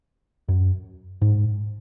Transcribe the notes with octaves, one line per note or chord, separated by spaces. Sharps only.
F#2
G#2